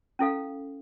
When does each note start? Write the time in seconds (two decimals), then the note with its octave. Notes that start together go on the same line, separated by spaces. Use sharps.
0.19 C#4 E4 A4 F5